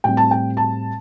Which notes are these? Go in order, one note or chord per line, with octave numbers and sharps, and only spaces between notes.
A2 G3 C4 G5
A5
G5
A5